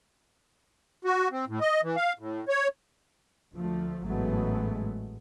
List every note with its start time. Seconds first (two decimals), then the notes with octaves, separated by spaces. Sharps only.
1.05 F#4
1.31 C4
1.48 A2
1.61 D#5
1.83 E3
1.96 F5
2.19 A2
2.48 C#5
3.54 D2 F3 A3
4.05 A1 G#2 F#3 G#3 A3 B3